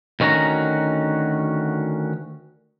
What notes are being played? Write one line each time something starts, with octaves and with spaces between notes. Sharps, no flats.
D2 D#3 C#4 F#4 A#5